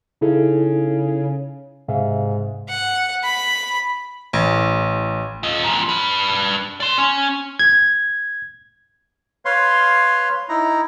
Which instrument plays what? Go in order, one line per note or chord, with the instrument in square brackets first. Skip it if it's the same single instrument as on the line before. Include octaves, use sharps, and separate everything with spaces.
[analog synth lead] C#3 [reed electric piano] D#4 E4 A4
[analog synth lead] G#2 [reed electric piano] C3 E5 F5
[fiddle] F#5
B5
[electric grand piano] A1
[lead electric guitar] F4 D#5
G#2 F3
D4 B4
D5 C6
C#4
[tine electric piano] G#6
[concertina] B4 C#5 F5 C6
D#4 E4 A#5